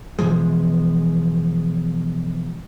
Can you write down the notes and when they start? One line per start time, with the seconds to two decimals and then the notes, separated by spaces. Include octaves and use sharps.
0.19 B2 E3 F3 G#3